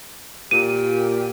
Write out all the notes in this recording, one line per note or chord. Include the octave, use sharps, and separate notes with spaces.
A#2 G4 D#7